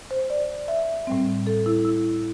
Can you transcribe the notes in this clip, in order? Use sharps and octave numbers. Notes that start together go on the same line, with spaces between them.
C5
D5
E5
A2 G3 C4
A4
E4
E4